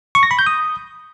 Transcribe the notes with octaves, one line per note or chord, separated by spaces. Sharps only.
C#6
A#6
B5
G6
D#6